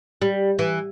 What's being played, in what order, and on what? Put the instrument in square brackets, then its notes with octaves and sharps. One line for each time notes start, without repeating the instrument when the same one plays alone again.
[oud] G3
E3